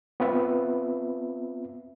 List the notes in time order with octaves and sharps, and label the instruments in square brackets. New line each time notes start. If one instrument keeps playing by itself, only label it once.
[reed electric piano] B3 C4 F4 B4 E5